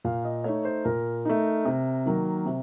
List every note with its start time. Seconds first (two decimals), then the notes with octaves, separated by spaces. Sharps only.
0.04 A#2 F5
0.24 D#5
0.44 A3 D#4 C#5
0.65 C5
0.85 A#2 A#4
1.25 A3 D#4
1.65 C3
2.06 D#3 F#3 A#3
2.46 C3